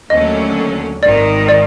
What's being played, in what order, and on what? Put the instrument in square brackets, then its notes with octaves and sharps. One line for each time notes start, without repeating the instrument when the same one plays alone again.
[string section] D#2 D3 F#3 A3 C#4 [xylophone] D#5
[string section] G#1 G#2 D#3 [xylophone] D5
[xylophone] D5